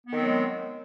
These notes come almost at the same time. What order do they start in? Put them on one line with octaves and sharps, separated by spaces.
B3 D#3 C4 F#3 G#3